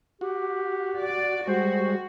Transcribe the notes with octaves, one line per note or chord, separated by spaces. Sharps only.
F#4 G4
D5
G3 G#3 F#4 C5